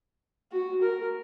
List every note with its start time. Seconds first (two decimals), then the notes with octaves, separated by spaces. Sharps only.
0.52 F#4
0.82 A#4